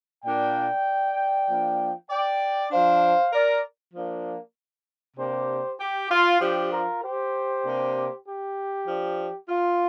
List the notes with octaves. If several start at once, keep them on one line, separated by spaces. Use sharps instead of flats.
A#2 A#3 D4 D5 G5
F3 A#3 D4
D5 G5
F3 D4 C5 F5
A#4 D5
F3 A#3 D4
C3 A#3 D4 G4 C5
G4
F4
F3 D4 G4
F4 A#4
G4 C5
C3 A#3 D4
G4
F3 D4
F4